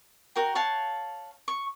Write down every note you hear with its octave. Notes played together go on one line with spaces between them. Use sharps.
F#4 A#4 G5
C#5 F5 F#5 A5
C#6